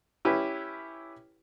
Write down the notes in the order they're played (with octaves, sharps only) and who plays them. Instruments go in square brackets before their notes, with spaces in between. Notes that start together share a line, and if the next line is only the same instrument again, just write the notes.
[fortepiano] C#4 E4 G4 B4